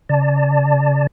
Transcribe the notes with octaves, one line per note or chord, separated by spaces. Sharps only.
C#3 D5 A5